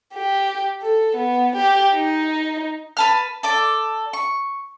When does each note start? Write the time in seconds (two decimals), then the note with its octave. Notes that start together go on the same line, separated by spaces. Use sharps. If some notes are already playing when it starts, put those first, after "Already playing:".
0.14 G4
0.82 A4
1.16 B3
1.56 G4
1.93 D#4
2.97 B4 A5 F6
3.43 A4 D5 D6
4.13 C#6